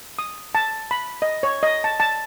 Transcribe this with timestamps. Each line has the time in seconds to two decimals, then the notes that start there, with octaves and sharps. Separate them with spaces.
0.19 D#6
0.55 A5
0.91 B5
1.22 D#5
1.43 C#5
1.63 D#5
1.84 A5
2.00 A5